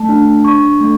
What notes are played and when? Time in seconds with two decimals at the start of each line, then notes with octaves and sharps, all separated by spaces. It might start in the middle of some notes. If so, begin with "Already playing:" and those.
Already playing: A3 A5
0.09 D4
0.45 D4 C#6
0.80 A3